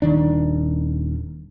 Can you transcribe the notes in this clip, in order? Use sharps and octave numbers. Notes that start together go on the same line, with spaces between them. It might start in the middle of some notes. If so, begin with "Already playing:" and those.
D#1 D#3 D4